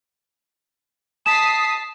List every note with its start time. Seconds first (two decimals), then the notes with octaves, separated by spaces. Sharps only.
1.26 A5 D#6 B6 C7 E7